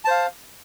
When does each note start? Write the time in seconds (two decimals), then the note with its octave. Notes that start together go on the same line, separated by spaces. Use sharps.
0.05 A5
0.08 C5
0.11 F5